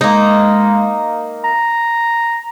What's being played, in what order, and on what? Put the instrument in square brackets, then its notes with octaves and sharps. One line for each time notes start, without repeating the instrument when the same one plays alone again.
[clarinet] G#3 [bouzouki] A#3 D#4
[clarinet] A#5